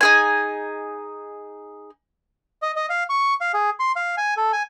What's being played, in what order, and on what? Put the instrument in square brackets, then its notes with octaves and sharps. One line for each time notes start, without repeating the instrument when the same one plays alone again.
[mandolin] D#4 G#4 G#5
[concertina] D#5
D#5
F5
C#6
F5
G#4
C6
F5
G#5
A4
G#5